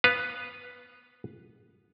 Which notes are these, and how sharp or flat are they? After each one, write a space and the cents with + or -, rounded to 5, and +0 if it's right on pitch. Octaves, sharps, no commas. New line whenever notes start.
B3 +0 B4 +0 F5 +0